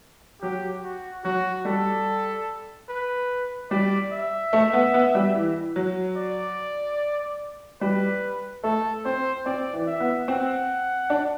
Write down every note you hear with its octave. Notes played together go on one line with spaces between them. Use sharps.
F#3 G4
F#4
F#3 F#4
G3 A4
B4
G3 D5
E5
A3
B3
B3
G3
E3
F#3
D5
G3 B4
A3 A4
C4 C5
C4 D5
E3
E5
B3
C4 F#5
D4